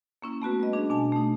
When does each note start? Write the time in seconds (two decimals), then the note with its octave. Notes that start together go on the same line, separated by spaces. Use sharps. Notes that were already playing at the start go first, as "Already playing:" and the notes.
0.22 A#3 C#4 E4
0.42 A3 B3 F#4 B4
0.60 G3 D#5
0.73 D4 G#4
0.90 B2 D4 G#5 A5
1.12 A3 D#4